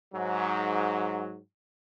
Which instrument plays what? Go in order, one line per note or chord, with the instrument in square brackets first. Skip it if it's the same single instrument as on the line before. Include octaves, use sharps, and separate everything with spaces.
[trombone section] G#2 F#3